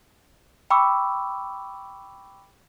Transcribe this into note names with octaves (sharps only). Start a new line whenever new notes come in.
G5 B5 C#6 D6 E6